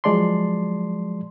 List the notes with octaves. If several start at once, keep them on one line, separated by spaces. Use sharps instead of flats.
F3 F#3 G#3 D5 A5 C6